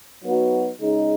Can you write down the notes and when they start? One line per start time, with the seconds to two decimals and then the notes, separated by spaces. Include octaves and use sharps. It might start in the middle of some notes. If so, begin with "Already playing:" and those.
0.22 F#3 B3 D#4 F#4
0.80 C#3 G#3 D#4